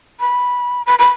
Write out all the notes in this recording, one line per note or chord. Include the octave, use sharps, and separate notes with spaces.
B5
B5
B5